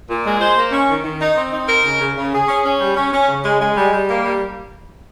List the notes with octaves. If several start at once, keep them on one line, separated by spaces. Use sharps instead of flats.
A#2
G#3
C5
A#3
C#4
D#3
D#3
D#4
C4
D#4
A#4
C#3
C#3
C#3
G#4
C#4
C#4
G3
C#4
C#4
C#3
G#3
G#3
G3
G3
A#3
G3